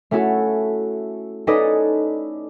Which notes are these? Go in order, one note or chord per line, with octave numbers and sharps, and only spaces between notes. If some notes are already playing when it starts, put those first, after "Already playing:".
A3 C#4 E4 F#4 A4
C#4 D#4 A4 B4 D5 D#5